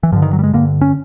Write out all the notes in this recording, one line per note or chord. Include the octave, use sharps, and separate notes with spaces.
E3
G2 D3 F3
D#3
F#3
G3
G#3
G2 D3 A#3
C#4